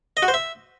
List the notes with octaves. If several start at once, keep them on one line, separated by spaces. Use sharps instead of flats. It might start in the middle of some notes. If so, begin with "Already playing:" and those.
D#5
F#4
C5
E5